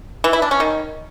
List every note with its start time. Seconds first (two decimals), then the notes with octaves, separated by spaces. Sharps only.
0.24 E3
0.33 E4
0.42 D4
0.51 C#4
0.60 D#3